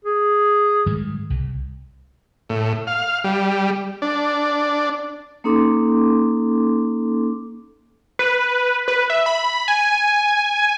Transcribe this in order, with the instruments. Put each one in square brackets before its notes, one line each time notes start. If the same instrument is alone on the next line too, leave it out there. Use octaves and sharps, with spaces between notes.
[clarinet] G#4
[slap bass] G#2 D#3 G3
C2
[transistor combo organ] A2
F5
G3
D4
[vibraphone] A#3 C#4 D#4 A4 C6 D6
[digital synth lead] B4
B4
E5
B5
G#5